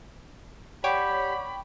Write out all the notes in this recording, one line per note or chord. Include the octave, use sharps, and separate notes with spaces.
G4 C#5 D5 F#5 G5 B5 C#6 D6